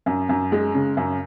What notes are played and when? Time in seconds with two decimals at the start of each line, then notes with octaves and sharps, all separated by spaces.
0.06 F#2
0.29 F#2
0.52 G#3
0.74 C#3
0.97 F#2